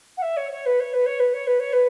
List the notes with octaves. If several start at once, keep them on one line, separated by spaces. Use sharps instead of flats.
F#5
E5
C#5
C#5
B4
C#5
B4
C#5
B4
C#5
B4
C#5
B4